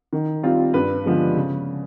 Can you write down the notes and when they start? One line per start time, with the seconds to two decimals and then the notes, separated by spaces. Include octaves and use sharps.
0.13 D#3
0.43 G3 C4 F4
0.74 G2 B4
1.05 D3 F3 G#3 B3
1.36 C#3